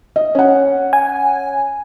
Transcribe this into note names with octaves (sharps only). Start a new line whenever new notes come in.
D#5
C#4 F#5
G#5